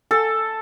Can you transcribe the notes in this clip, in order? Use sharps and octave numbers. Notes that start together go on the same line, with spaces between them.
A4